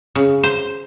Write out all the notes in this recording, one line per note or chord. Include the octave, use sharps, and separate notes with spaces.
C#3
C5